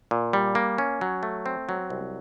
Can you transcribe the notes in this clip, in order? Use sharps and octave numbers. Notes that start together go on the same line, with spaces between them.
A#2
G3
A#3
C#4
F#3
A3
C4
F#3
C2